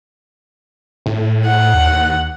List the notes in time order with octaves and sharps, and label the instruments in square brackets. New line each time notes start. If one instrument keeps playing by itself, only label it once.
[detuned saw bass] A2
[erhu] F#5
[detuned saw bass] D#2